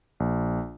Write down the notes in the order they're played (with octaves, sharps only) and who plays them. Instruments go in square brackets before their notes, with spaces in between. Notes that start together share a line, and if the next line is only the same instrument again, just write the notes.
[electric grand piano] A#1